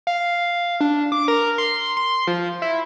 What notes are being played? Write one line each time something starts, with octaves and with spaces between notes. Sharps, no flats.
F5
D4
D6
A#4
C6
C6
F3
E4